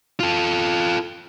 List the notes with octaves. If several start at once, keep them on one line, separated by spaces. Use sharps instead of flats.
F4 A4